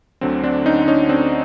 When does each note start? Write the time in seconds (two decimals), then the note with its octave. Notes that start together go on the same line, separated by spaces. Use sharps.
0.21 D2 D3 F#3 C4
0.43 C4 D4
0.66 C#4 D#4
0.88 C#4 D#4
1.09 C4 D4